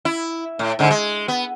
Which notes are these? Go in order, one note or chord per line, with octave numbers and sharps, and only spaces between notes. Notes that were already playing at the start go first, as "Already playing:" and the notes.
E4
A2
G#2 D3
G#3
B3